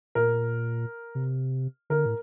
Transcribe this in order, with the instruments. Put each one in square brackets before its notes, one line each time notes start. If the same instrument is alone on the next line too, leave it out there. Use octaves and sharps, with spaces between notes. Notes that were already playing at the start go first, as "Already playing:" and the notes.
[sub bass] A#2 [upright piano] A#4
[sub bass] C3
[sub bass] D3 [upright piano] A#4
[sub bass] A2